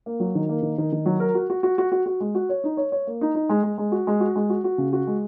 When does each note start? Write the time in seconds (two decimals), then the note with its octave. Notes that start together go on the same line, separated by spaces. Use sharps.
0.06 A#3
0.20 F#3
0.35 D#3
0.49 A#3
0.63 D#3
0.78 D#3
0.92 D#3
1.06 F#3
1.20 A#4
1.35 F#4
1.50 F#4
1.63 F#4
1.78 F#4
1.92 F#4
2.06 F#4
2.20 G#3
2.35 F#4
2.49 C#5
2.64 D#4
2.77 C#5
2.92 C#5
3.07 A#3
3.21 D#4
3.35 D#4
3.49 G#3
3.63 G#3
3.78 G#3
3.92 F#4
4.07 G#3
4.20 F#4
4.36 G#3
4.50 F#4
4.64 F#4
4.78 C#3
4.93 F#4
5.07 G#3